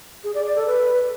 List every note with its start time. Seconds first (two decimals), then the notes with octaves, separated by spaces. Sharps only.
0.24 G#4
0.35 D5
0.45 D5
0.56 A4
0.66 B4